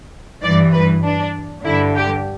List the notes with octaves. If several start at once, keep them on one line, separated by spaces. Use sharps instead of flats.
G2 E3 D5
B4
D4
G2 D3 E4
G4